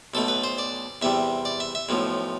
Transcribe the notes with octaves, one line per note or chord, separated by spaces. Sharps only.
B1 B2 A3 A4
B4
C5
D5
E2 C3 G3 E5
D5
E5
E5
B1 A2 F3